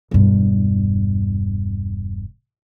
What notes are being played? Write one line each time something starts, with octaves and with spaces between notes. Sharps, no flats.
E1 G2